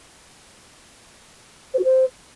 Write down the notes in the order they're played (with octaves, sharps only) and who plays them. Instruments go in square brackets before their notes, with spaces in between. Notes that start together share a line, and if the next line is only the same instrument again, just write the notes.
[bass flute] C5
F#4
C5